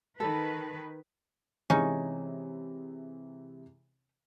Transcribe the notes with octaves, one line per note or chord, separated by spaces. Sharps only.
D#3 A4 B4
C3 E3 G#3 C#4 D#4